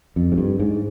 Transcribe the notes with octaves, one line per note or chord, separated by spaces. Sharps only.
F2
G#2
G2
G#2